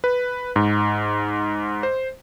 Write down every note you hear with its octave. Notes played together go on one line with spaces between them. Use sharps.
B4
G#2
C5